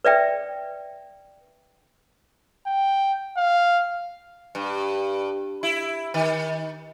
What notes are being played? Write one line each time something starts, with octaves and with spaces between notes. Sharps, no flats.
B4 D5 E5 G5
G5
F5
G2
E4
D#3